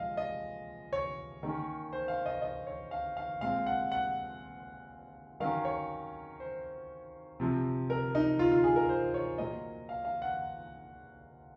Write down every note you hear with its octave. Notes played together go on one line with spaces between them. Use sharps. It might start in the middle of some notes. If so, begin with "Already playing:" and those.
Already playing: A#2 F3 G#3 D#5 F5
D#5
C#5
D#3 A#3 C#4
C5
F5
D#5
D#5
C#5
F5
F5
A#2 G#3 C4 F5
F#5
F#5
D#3 F#3 C#4 F5
C#5
C5
C3 F3 C4
A#4
D#4
F4
F4
G#4
A#4
C5
C#5
A#2 F#3 A#3 D#5
F5
F5
F#5